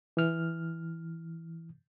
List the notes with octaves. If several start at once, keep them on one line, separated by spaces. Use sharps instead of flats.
E3 F6